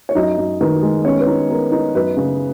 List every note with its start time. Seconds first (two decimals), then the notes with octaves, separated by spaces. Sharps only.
0.09 C#5
0.15 F#2 D#4 D#5
0.37 F#2
0.61 D#3 B4
0.82 G#3
1.05 B3 C#4 C#5
1.20 B4
1.27 D#4
1.50 B3 A#4
1.72 D#4
1.94 F#2 B4
2.17 C#3